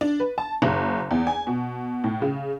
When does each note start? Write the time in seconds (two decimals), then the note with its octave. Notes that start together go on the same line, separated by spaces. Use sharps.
0.01 D4
0.20 B4
0.38 A5
0.62 F#1
1.11 E2
1.27 G#5
1.47 B2
2.04 A2
2.22 C#3